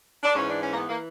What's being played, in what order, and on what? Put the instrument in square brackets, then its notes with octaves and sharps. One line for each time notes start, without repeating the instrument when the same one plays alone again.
[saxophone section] D4
G#2 E3 C#4
D4
C#4
A#3
B3
E3 A#3